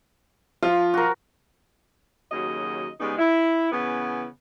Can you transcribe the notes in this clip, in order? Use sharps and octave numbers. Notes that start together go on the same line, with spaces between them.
F3 F4
F#4 A#4
D#2 C#3 F#3 F#4 D#5
C#3 G3 G#3 B3 D#4
E4
C#3 E3 B3